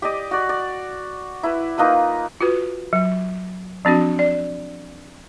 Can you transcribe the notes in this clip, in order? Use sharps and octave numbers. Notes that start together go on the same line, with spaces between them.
G4 D5 D#5
F#4 D5
D5
E4 B4
A#3 D#4 F4 B4
F4 F#4 B4
F#3
F3 C4 D4 F#4
D5